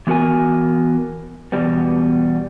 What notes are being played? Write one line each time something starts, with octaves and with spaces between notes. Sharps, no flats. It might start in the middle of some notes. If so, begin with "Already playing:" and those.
E3 B3 F#4 A#4 G#5
E2 B2 G3 B3